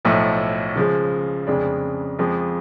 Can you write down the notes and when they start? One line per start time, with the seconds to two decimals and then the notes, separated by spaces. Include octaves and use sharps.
0.05 B1 A2 F3 A3
0.76 C#3 F3 G#3
1.47 F1 F2 C#3 G#3 D4
2.19 F2 F3 G#3